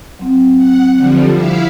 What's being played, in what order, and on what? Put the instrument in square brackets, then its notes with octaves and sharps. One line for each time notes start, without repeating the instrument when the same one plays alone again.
[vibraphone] F#3 C4
[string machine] F#5
D3 F3 G3
E4 E5 F5